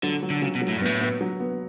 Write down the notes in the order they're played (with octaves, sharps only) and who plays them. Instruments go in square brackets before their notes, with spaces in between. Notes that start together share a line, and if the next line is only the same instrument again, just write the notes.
[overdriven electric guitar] D3 [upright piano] F#3
[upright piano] F#3
[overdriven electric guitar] D3
[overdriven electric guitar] C#3 [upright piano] F#3
[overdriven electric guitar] B2
[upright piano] F#3
[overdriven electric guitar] A2
G2
[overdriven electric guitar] A2 [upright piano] B3
[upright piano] B3
F#3
B3